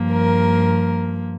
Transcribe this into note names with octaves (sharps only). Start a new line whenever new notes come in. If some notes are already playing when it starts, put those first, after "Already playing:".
Already playing: G2 F3 A#3
A#4